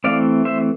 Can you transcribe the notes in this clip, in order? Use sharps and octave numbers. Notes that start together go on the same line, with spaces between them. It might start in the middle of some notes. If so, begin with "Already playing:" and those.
E3 A3 C4 D5 F5
C5 E5